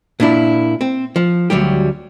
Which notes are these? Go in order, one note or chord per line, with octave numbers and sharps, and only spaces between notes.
A#2 D4 E4
C4
F3
D2 F#3 G3 G4